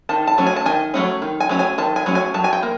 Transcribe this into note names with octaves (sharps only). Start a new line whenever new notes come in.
D#3 A5
A5
F#3 A3 C#4
G#5
A5
D#3 G#5
F#3 A3 C#4
D#3
G#5
F#3 A3 C#4
G#5
D#3 A5
G#5
F#3 A3 C#4
G#5
F#3 A5
G#5
G5
A#3